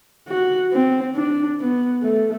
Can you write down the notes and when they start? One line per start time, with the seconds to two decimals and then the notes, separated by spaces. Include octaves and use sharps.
0.28 F#4
0.72 C4
1.15 D4
1.60 B3
2.03 A3